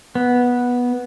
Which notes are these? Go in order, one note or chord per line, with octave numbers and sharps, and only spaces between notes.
B3